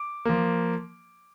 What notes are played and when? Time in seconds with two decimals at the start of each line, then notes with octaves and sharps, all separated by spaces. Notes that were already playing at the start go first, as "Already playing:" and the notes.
Already playing: D6
0.25 F3 A#3